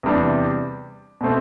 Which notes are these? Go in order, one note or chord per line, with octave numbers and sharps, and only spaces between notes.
E2 C3 G3 D4
B2 A3 C4